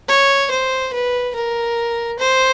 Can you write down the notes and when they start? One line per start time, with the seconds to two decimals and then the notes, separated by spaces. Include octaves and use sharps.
0.09 C#5
0.51 C5
0.93 B4
1.35 A#4
2.20 C5